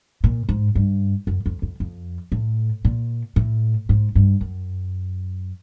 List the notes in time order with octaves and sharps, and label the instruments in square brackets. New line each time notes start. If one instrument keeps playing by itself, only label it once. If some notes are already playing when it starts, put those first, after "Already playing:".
[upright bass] A#2
G#2
G2
F#2
F2
F2
F2
A2
A#2
A2
G#2
G2
F#2